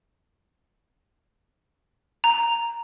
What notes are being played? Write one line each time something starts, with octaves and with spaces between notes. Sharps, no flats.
A#5